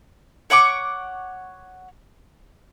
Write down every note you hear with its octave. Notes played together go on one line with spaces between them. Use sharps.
C#5 F#5 C#6 D6